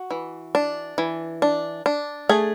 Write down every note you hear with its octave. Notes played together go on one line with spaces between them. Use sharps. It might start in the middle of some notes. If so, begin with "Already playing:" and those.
Already playing: F#4
E3
D4
E3
D4
D4
A3 G#4